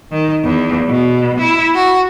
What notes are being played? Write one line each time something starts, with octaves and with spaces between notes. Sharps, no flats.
D#3
E2
B2
E4
F#4